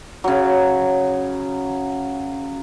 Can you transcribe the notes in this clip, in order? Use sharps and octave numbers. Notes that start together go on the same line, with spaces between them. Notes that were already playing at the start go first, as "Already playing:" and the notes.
C#3 F#3